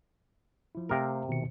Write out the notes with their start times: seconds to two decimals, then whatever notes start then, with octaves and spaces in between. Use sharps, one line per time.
0.75 F3 E4
0.89 C3 A3 A#4 F5 G5
1.29 B2 D#3 C#7